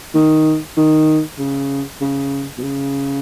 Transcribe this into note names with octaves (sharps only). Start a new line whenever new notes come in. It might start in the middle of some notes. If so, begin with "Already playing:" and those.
D#3
D#3
C#3
C#3
B2
C#3